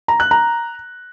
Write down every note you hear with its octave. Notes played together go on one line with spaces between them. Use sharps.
A#5
F#6
A#5